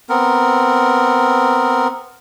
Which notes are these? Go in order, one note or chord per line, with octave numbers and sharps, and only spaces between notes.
B3 C4 A#4